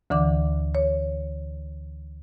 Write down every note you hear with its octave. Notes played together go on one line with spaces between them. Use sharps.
D2 D3 E3 D6
C#5